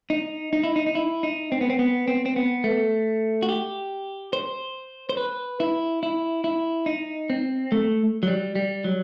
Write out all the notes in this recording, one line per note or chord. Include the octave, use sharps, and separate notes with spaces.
D#4
D#4
E4
D#4
D#4
E4
D#4
C4
B3
C4
B3
C4
C4
B3
A3
F#4
G4
C5
C5
B4
E4
E4
E4
D#4
C4
A3
F#3
G3
G3
F#3